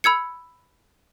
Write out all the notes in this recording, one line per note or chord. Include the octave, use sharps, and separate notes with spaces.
B5 E6 G#6 C#7